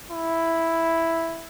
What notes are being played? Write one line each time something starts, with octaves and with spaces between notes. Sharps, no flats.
E4